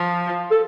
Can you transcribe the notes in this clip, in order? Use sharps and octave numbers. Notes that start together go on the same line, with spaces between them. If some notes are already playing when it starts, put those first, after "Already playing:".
Already playing: F3
A4